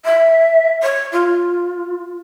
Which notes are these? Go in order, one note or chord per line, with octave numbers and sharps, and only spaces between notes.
E5
C#5
F4